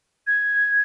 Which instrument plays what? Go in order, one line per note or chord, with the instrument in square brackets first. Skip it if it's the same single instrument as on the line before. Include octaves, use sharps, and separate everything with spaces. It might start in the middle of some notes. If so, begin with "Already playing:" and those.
[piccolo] G#6